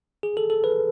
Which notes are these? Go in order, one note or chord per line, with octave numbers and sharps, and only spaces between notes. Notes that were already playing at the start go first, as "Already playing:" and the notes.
G#4
A4
A4
B4